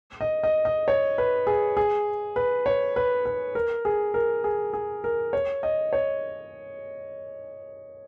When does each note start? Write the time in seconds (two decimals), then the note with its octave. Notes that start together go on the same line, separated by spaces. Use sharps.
0.21 D#5
0.44 D#5
0.65 D#5
0.88 C#5
1.18 B4
1.47 G#4
1.77 G#4
2.36 B4
2.66 C#5
2.96 B4
3.25 B4
3.55 A#4
3.85 G#4
4.14 A#4
4.44 G#4
4.73 G#4
5.04 A#4
5.33 C#5
5.63 D#5
5.93 C#5